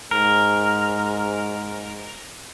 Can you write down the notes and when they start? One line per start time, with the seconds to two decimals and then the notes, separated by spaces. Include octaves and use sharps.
0.11 G#2 A#4